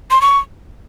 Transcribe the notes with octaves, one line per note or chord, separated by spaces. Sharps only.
C6
C#6